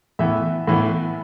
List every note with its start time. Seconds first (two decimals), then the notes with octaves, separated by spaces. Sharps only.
0.19 A2 E3 B3 E5
0.68 A2 E3 B3